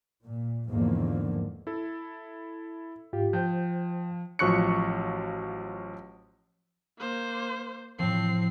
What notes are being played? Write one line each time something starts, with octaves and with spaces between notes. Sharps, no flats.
A#2
E2 G#2 D3 D#3 F3 A#3
E4 A4
G#2 F4 G4
F3 C5 G5 G6
A1 F3 F#3 C#6 F#6 C#7
A#3 C5
A2 F3 C4 C7